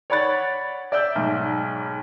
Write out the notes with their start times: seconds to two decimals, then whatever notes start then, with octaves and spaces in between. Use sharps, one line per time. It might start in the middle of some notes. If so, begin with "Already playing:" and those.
0.10 C#5 D5 F#5 B5 F#6 A6
0.92 D5 E5 E6 G6
1.15 B1 G#2